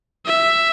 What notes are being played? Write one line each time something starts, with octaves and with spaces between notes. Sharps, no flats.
E5